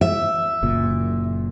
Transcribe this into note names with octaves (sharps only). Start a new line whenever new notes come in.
E5
F#1 A#2